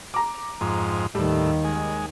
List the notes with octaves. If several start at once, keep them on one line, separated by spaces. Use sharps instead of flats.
A#5 D6
F2 G#2
D#2 A2 D#3 G3
G#3